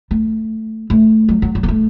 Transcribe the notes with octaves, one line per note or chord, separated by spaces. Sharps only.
A3
A3
F#3
F#3
F#3
B3
A3